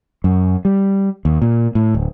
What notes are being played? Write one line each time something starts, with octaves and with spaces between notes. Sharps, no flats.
F#2
G3
D#2
A#2
A2
D1